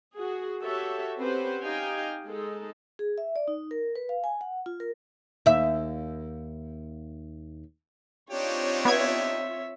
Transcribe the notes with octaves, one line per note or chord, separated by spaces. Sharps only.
F#4 G#4
F#4 G4 A4 C#5 E5
C4 C#4 G4 B4 C5 F#5
D#4 G4 D#5 F5 G5 G#5
G#3 D#4 A4
G#4
E5
D5
D#4
A#4
B4
F5
G#5
F#5
F4
A#4
D#2 E5
C4 D4 D#4 F4 G4 C#5
B3 E5 G#6